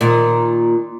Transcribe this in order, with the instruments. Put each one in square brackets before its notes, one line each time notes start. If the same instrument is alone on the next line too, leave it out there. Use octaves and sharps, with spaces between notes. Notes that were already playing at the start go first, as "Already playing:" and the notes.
[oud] A#2 D#3